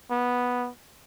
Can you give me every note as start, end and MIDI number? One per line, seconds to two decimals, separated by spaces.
0.11 0.70 59